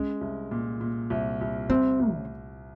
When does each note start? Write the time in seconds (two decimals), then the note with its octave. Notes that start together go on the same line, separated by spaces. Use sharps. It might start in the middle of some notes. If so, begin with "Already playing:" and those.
Already playing: G#3 C#4
0.21 C2
0.51 A#2
0.81 A#2
1.10 C2
1.41 C2
1.70 C2 C4
1.99 C2
2.14 C#3